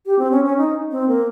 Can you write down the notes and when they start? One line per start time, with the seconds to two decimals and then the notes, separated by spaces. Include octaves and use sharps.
0.06 G4
0.19 C4
0.31 C#4
0.44 C#4
0.58 D#4
0.91 C4
1.08 A#3